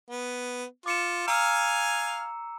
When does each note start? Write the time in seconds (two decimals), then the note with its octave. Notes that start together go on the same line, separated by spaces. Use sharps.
0.10 B3
0.86 F4 D6 C#7 E7
1.28 F5 G#5 A#5 E6 F6